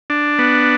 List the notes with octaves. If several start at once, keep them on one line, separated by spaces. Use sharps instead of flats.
D4
B3